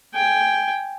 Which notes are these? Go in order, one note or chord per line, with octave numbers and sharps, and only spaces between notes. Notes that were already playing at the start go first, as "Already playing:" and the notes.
G5 G#5